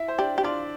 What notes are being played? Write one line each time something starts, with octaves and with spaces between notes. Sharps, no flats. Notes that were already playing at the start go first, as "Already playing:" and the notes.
Already playing: E4 E5
C5
D4 G4 D5
G4
D4 F4 D5